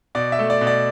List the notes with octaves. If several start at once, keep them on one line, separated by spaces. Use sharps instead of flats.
B2 D5
E5
A3
D5
B2
D5